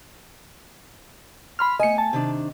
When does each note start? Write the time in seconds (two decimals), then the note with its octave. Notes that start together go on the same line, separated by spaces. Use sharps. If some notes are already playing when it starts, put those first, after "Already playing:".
1.59 B5 C6 F6
1.80 A3 D#5 G#5 C#7
1.98 A5
2.13 C3 D#3 D4